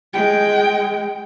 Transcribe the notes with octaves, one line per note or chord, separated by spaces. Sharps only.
G#3 G5